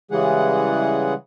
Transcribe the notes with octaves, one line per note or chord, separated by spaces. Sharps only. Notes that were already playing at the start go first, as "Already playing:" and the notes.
C#3 E3 G3 G#3 G#4 F#5